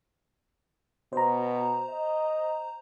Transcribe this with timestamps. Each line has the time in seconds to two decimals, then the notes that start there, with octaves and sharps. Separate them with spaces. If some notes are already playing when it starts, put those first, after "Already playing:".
1.13 B2 C5 A#5
1.89 D#5